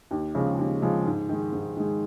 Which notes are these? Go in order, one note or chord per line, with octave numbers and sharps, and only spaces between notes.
D#2
C#3 F3 G#3
D#2
C#3 F3 G#3
G#2
D#3 G#3
G#2
D#3 G#3